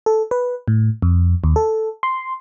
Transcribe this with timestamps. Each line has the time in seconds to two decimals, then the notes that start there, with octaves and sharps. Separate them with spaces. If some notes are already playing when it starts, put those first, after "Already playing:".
0.06 A4
0.31 B4
0.68 A2
1.02 F2
1.44 D#2
1.56 A4
2.03 C6